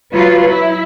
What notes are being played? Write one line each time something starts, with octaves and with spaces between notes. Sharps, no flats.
F#3 F4 B4
E4